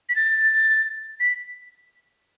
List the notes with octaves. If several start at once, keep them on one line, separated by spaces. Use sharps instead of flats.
B6
A6
B6